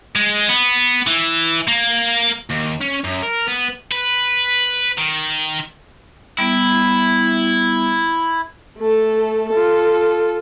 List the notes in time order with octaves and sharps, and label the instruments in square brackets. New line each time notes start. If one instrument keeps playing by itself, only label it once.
[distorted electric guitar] G#3
B3
E3
A#3
D#2
C#4
F#2
A#4
B3
B4
D#3
[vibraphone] G3 B3 [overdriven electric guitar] E4
[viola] A3 A4
F4 A4